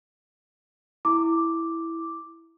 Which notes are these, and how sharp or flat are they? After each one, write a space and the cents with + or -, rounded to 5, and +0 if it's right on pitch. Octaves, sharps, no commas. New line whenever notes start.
E4 +0 D6 +0